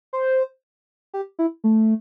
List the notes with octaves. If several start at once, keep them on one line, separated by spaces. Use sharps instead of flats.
C5
G4
E4
A3